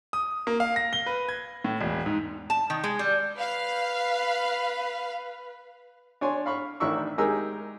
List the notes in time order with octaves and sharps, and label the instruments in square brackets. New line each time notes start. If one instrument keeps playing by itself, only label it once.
[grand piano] D#6
A#3
F5
A#6
G7
B4
G#6
A2
E1
G#2
[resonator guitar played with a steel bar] A5
D#3
G#3
G3
[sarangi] B4 [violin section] F5
[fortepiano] D4 C#5 G#5 C6
F5 B5 C#6 F6
A1 D#3 D4 E4 C#6 E6
G#3 D#4 G4 G#4 A#4 E6